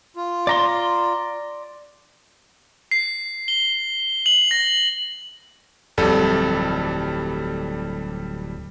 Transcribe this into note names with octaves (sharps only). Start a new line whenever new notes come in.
F4
D5 A#5 C6
C7
G7
F#7
A#6
D1 F2 F#3 G3 A4